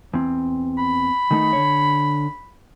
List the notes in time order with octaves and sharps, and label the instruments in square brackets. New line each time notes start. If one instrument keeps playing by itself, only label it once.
[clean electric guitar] E2 C4
[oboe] B5
[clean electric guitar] D#3 A3 D#4
D3 C#5